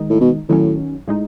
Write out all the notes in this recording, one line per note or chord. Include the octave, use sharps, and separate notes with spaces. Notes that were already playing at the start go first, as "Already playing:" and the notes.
Already playing: D#3 G#3 D#4
A2
B2
A2 D#3 F#3 C#4
A2 G#3 D#4